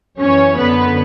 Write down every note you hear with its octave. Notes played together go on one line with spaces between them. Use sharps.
F#2 E3 C#4 C#5
F#2 D3 B3 B4